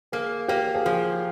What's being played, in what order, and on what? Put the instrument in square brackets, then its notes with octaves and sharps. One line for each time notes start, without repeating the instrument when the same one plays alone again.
[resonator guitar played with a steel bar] A#3 [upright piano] G#4
[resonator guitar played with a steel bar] A#3 [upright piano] G4
[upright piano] G#4
[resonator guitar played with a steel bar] F3 [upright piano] G4